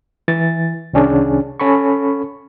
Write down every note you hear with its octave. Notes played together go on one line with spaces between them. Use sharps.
E3 A6
C2 D#3 C#4 D4 G#4
C#4 A4 B5 C#6